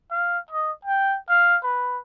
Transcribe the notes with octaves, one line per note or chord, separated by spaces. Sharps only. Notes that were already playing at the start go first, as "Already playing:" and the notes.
F5
D#5
G5
F5
B4